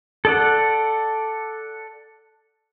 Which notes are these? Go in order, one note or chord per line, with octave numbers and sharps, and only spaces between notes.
A4 D5 F#5